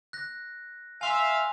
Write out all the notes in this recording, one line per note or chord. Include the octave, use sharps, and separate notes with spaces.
F#6 A#6
E5 F5 G#5 C6 F7